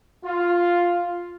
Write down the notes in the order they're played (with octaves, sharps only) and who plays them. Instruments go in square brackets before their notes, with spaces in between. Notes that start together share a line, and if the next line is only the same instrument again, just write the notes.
[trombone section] F4